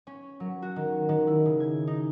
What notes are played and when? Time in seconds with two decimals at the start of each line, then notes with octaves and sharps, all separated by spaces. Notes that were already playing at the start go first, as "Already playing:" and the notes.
0.07 C#4
0.40 F#3
0.62 F#4
0.76 D#3
1.09 D#3
1.27 E4
1.46 C#3
1.60 G#6
1.87 D#4